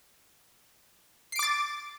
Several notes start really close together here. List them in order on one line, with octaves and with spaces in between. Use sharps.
C7 D7 D6 A6